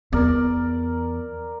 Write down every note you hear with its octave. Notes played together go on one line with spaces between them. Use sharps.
E2 A#4 D5